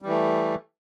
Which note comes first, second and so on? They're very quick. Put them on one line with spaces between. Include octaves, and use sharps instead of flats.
G3 E3 A3